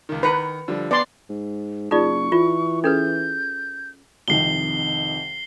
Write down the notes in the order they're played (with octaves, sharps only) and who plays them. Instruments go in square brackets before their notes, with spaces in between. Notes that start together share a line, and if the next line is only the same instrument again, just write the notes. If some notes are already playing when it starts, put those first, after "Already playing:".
[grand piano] C#2 D#3
[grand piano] D#3 A#5 C#7 [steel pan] B4
[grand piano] D3 F3 G3
[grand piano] B3 [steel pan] D5 C6
[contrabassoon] G#2
[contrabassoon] F#1 [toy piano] D#4 F4 D5 [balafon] G#4 [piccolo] C#6
[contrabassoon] E3 [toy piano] F4
[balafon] C#4 G#4 [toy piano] A4 B4 [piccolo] G6
[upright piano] C2 F2 D#3 [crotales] C7 G7